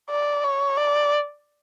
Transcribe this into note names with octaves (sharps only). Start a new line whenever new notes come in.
D5
C#5
D5